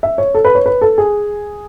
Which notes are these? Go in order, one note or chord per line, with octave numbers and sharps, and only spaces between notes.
E5
C#5
A4
B4
C#5
B4
A4
G#4